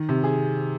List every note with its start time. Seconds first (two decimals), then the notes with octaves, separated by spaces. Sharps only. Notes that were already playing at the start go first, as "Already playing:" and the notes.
Already playing: D#3
0.09 C3
0.24 G#4